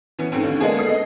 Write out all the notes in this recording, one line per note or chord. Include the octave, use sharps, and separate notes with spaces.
E3 B3 C#4
G#2 A3 C4 C#4
D#2 D3
G#3 A#3 B3 D4 G#4
B3 A4 D#6 C7
D#5